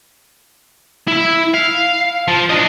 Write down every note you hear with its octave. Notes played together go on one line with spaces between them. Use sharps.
E4 E5
F5
F3
D4 D#5